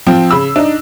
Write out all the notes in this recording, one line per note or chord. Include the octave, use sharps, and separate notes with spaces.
F3 C4
C#3 B5 E6
D4 D#4